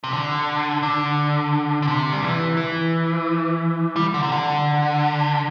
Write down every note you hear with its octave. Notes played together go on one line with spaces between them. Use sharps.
C3
D3
D3
D3
C3
G3
E3
E3
G3
D3
C3
D3